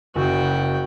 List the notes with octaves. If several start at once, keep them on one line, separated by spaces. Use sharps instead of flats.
F#1 C#3 F#4 G5